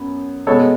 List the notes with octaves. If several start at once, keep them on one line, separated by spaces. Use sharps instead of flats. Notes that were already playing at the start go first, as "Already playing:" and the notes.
Already playing: F#2 B3
B2 G#3 B3 A4 C#5